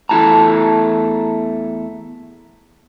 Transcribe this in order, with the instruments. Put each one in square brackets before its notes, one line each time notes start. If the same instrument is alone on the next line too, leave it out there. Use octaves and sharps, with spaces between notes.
[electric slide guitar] E2 A3 E4 A5 A#5